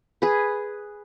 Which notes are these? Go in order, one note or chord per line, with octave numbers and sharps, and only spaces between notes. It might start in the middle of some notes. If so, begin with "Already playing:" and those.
G#4 B4